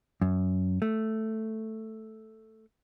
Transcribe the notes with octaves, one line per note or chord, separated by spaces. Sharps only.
F#2
A3